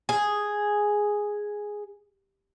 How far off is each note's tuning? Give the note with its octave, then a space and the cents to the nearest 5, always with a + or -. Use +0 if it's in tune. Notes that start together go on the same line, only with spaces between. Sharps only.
G#4 +0